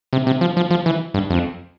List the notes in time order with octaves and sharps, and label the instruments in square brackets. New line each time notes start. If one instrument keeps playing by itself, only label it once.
[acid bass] C3
C3
F3
F3
F3
E3
G2
F2